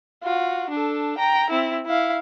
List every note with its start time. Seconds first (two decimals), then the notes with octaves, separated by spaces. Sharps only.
0.23 F4 F#4
0.70 D4 A4
1.17 G5 A#5
1.50 C4 E4
1.86 E4 F5